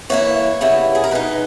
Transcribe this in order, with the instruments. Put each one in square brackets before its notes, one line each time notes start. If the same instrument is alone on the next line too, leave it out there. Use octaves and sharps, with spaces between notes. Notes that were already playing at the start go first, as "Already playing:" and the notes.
[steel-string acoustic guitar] E3 A#3 E4 C#5
C#3 G3 B3 E4
G#4
A#4
B2 G#3 D#4 B4